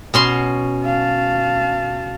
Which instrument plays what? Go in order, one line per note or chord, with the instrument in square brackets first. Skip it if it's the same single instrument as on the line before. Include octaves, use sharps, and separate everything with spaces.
[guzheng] B2 C#4 C6
[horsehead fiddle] F5 A5